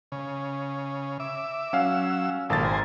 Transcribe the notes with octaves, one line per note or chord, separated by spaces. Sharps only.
C#3
E5 D6
F#3 C#4 F5 E6
G#1 A#2 F3 A4 A6
C5 G#5 A#5